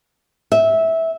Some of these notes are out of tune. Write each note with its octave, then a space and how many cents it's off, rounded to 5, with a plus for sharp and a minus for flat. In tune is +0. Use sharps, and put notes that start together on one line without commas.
E5 -15